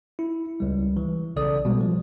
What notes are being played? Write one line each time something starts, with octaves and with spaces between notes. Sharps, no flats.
E4
C#2 G3
E3
B1 C#3 A4 D5 D#6
B2 G3 G#3
F3